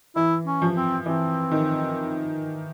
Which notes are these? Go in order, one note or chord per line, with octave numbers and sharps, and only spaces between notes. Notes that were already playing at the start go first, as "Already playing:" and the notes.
E3 E4
C#4
F3
C4
E3 C4
D#3